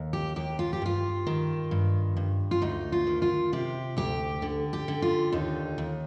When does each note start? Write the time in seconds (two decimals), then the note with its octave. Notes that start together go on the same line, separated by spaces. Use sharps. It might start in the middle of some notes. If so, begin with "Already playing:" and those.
Already playing: D#2
0.13 G4
0.36 D#2 G4
0.59 F4
0.73 G4
0.82 G2 F4
1.27 D#3
1.71 G2
2.17 G2
2.51 F4
2.62 D2 D#4
2.92 F4
3.07 D#3
3.22 F4
3.53 C3 G4
3.97 D2 G4
4.42 D3
4.73 G4
4.88 D3
5.02 F4
5.32 D#2 D#4
5.78 D#2